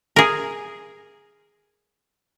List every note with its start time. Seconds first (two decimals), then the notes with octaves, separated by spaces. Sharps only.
0.16 G#4 A#4